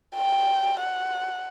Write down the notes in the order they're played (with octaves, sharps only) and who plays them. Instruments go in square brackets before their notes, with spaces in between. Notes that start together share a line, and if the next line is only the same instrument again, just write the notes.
[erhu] G5
F#5